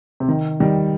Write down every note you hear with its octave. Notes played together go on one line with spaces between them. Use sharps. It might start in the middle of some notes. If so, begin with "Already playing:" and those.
C3
D#3
D#3 G3